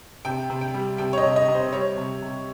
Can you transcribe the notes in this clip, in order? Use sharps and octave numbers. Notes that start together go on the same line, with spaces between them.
C3 G5
C3
G5
G3
C3 G5
C#5
D#5
C3
D#5
C3
C5
G3 C#5
C3
C3